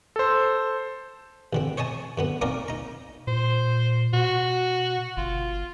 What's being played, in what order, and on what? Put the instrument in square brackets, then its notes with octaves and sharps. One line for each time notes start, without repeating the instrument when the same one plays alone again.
[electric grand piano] A4 C5
[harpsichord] A1 D3 C4
C5 C#5 D#5 G#5 A5
F#2 D3 B3
A#3 C4 C#4 D#4 A#4 D5
D#4 A#5
[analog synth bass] A#2 [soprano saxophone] C5
[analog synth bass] B2 [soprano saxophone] F#4
[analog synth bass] G1 [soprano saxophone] F4